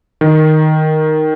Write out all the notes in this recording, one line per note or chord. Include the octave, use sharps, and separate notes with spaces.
D#3